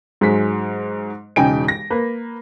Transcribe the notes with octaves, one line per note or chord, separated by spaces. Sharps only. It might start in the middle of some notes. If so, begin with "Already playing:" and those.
G#2 F#3 G#3 B6
E1 C#3 D#4 G5 G#5 D7
A#6
A#3 B4